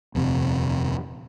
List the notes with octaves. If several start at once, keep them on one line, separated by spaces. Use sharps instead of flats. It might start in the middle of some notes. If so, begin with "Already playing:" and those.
D#1 F2 C3